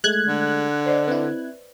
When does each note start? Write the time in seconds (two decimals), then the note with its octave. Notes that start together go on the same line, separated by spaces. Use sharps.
0.04 G#3 A3 F#6 G#6
0.28 D3
0.86 C5 D5 D#5
1.08 C4 E4 B4